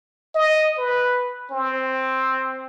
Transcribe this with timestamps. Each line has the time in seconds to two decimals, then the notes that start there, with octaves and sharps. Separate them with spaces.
0.35 D#5
0.78 B4
1.51 C4